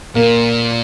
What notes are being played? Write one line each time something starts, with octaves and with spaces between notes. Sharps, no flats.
A#2 A#3